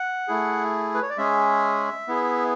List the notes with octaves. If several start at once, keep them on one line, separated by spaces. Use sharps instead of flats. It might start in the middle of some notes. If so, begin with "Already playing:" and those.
Already playing: F#5
A3 E4 G#4
B4
C#5
D5
G#3 C#4 G#4 E5
B3 E4 G#4